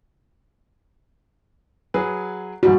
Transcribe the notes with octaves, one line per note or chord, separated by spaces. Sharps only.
F#3 G#4 B4
A#1 G#2 G3 F#4